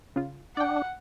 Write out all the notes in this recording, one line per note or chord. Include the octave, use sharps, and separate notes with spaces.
C#3 F4
D4 D5 F#5 G5